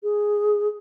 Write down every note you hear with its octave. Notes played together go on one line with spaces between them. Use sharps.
G#4